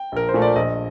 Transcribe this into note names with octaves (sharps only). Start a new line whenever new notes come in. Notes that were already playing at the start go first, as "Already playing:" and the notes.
Already playing: G5
A#1 A#4
C5
A#2 A3
D5
A#1 D#5